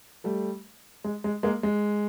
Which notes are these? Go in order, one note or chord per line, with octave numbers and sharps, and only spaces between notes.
G3 A3
G#3
G#3
G#3 A#3
G#3